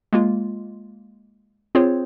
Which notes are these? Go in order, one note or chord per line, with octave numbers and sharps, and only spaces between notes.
G#3 A#3 F4
C4 F4 G#4 C5 C#5